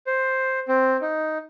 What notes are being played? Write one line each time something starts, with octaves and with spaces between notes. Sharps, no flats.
C5
C4
D#4